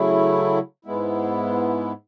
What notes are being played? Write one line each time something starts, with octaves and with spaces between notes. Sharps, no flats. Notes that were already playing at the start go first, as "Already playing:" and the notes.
Already playing: C#3 F#3 A3 E4
G#2 G#3 B3 E4